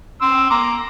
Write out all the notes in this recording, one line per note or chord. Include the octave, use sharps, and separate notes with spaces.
C6 E6
A#5 D6